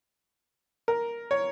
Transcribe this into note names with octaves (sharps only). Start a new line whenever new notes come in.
A#4
C#5